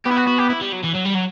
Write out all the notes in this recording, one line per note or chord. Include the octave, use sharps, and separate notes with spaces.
B3 G4
E4
F#4
F#4
G4
E4
G3
F#3
E3
F#3
G3
F#3